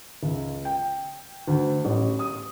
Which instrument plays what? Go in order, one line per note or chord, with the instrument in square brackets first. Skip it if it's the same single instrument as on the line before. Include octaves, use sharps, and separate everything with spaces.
[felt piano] C#2
G5
D2
A1
D#6